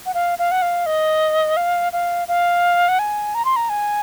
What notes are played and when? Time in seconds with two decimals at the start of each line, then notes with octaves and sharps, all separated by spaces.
0.06 F#5
0.14 F5
0.39 F5
0.51 F#5
0.62 F5
0.86 D#5
1.57 F5
1.93 F5
2.28 F5
2.89 F#5
2.99 G#5
3.35 A#5
3.45 C6
3.56 A#5
3.69 G#5